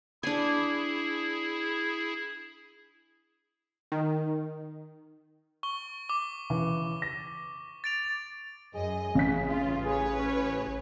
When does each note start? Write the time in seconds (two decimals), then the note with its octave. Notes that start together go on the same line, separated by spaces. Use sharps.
0.23 D4 E4 G#4 G#5
3.92 D#3
5.63 C#6 G7
6.09 D6 G7
6.50 C#3 E3
7.02 A#6
7.84 A6 D7 F7
8.75 F#2 G#4 D#5
9.15 A1 C#3 E3 B6
9.49 F4
9.85 G#4 B4 C#5
10.18 C#4